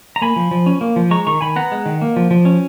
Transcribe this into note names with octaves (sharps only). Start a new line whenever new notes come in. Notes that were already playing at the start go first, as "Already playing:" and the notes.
A#5
A#3 G#5 B5
F3
F3
C#4
A#3
F3
G#3 A#5 C#6
D#3 A#5 C#6
D#3 G#5 B5
B3 F#5 A#5
G#3
D#3
A#3
F3
F3
C#4